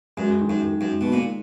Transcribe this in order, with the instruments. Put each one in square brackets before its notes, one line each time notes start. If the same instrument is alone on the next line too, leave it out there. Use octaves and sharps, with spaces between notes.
[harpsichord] F#2 [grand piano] G#3
[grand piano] D#3
[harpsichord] F#2
[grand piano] D#3
[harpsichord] F#2
[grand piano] G#3
[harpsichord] B2
[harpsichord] A#2 [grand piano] D#3